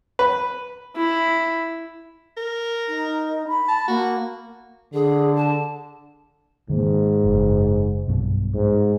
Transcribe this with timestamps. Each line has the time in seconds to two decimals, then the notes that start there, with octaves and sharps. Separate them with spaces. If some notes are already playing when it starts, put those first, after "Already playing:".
0.19 B4
0.96 E4
2.37 A#4
2.89 D#4
3.48 B5
3.68 A5
3.88 A#3 F#4
4.94 D3 G#4
5.36 A5
6.70 G#2 D#3 A#3
7.24 F#1
8.07 B1 G2 B2
8.54 G#2